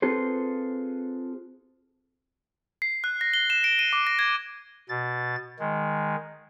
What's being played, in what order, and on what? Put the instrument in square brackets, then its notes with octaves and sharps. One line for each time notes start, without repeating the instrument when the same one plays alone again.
[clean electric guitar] C4 F4 G#4 A4 B4 C5
[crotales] C7
F#6
A#6
G7
E7
D7
D#7
D6
A#6
G#6
[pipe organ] B2 A6
D#3 G#3